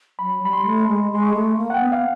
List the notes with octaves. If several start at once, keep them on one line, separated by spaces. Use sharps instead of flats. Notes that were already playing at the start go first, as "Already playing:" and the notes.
F#3 B5
G3 B5
C6
A3
G#3
G#3 C6
C#6
A3
A#3
F#5
G5
B3
F5